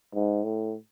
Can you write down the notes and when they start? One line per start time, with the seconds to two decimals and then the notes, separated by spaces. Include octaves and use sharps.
0.15 G#2
0.44 A2